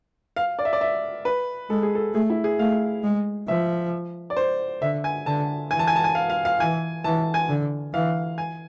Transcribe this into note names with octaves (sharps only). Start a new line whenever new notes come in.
F5
D5
E5
D5
E5
B4
G#3 A4
G#4
A4
A3 G#4
E4
G#4
A3 F5
G#3
F3 E5
D5
C5
D3 E5
G#5
D3 A5
E3 G#5
A5
G#5
A5
G#5
F5
F5
F5
E3 G#5
E3 A5
G#5
D3
E3 F5
G#5